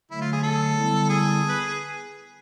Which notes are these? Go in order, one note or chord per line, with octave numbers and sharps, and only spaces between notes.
D3 F#3 A3 E4
F4
G#4
A4
D3 G3 B3 E4
G#4
B4